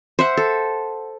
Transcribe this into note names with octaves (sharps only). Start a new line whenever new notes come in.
C5 E5 F#5
A4